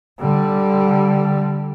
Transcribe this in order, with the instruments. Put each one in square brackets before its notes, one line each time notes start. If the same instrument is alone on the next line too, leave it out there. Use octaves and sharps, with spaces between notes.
[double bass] D3 G3